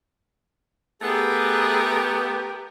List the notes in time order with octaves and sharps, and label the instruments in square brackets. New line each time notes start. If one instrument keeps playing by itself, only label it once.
[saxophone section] A3 B3 [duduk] G4 [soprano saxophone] G#4 [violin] A#4 B4